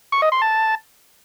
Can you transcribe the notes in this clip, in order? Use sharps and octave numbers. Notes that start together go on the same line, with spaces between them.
C#6
D#5
C6
A5